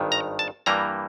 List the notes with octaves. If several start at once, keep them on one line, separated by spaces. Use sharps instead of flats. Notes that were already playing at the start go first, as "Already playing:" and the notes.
Already playing: G#1 G2 D#3
A#5
A5
G2 E3 G3 A#3 A#5